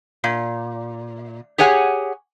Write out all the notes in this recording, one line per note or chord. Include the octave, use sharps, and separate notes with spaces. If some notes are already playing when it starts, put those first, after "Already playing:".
A#2
G4 G#4 C#5 F#5 G#5